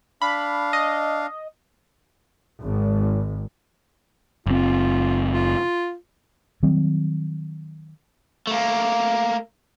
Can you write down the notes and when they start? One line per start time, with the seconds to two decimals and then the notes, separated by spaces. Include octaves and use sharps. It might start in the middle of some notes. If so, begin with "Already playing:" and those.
0.22 D4 F5 B5
0.73 D#5
2.60 G#1
4.47 F#1 C4 F4
5.30 F4
6.63 D#3 F#3 G3 C4
8.47 A3 A#3